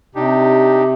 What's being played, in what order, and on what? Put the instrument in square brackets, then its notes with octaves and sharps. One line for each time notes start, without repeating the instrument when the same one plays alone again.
[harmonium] C3 [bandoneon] D4 D#4 G4